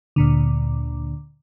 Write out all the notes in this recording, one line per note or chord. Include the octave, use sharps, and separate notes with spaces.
D2 A#2 D3